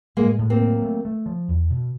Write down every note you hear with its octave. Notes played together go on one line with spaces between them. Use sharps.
A2 G#3 A#3
A2
A#3 C4
F#3
A3
A3
F3
E2
B2